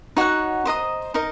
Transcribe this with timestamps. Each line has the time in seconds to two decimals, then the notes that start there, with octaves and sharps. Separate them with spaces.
0.17 D#4 F#4 C#5 F#5
0.65 C5 D#5 A#5 D#6
1.14 D#4 A#4 D#5